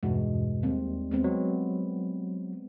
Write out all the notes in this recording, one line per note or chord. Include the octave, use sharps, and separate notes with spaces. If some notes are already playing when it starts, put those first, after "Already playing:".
E2 G2 B2 G#3
D#2 G3 C4
G#3 B3 C4
F#3